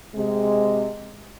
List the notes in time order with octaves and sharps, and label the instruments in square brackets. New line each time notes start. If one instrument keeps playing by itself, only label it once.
[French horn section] C3 G#3